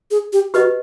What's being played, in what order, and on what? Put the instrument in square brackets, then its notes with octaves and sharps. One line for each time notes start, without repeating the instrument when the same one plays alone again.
[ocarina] G#4
G4
[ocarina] F#4 [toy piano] G4 B4 D#5